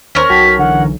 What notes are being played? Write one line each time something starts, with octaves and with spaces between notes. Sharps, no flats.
D#2 C#4 A#4 C5
B1 F#4 G5 A5 B6
D3 E3 F#5